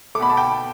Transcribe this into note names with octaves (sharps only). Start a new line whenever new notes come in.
B2 A3 B5 D6
A5
G5 B5